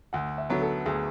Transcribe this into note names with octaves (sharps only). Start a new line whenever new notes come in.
D2 F#5
E5
D3 F#3 B3
A4
D2 G#4